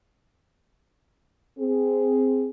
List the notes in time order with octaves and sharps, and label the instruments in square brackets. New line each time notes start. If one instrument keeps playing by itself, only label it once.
[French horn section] C4 G#4